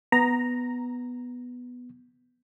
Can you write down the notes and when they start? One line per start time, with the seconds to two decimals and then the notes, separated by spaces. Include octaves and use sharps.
0.12 B3 A#5